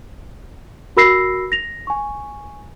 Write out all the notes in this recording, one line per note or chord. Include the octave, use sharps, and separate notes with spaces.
F#4 A#4 B5 E6 A#6 C7
A#6 F7
G#5 C#6